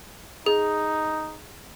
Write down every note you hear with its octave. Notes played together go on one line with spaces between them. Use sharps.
D#4 G#4